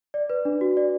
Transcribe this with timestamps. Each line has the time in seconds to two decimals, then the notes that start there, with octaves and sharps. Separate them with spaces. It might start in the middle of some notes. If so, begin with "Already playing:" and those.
0.14 D5
0.30 B4
0.45 D4
0.61 F#4
0.77 D5